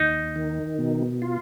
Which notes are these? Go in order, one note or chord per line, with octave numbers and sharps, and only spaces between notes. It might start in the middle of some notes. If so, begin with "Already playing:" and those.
Already playing: D#2 D#4
D#3
B2
F4